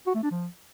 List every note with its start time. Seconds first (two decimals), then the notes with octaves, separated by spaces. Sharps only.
0.07 F#4
0.15 A3
0.23 D4
0.31 F3